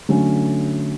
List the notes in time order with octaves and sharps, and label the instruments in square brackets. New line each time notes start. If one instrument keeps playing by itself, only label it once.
[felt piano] D3 F#3 A3 C#4